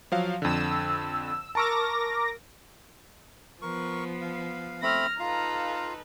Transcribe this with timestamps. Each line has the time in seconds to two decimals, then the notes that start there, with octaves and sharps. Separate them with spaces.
0.12 F3 F#3 F5
0.42 F2 D3 E6
1.55 A#4 A5 C#6 D6 E6 A#6
3.62 F3 B3 A#4 C#6
4.21 F5
4.82 A3 C4 B5 F6 A#6
5.20 D#4 F4 A4 B4 F5 A#5